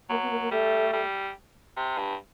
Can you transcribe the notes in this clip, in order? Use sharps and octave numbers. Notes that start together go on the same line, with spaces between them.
F#3 A#3
B3
A#3
A#3
G3 A3
G3
C3
G2